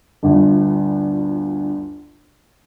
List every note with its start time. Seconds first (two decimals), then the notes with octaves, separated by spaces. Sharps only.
0.23 G1 D2 F4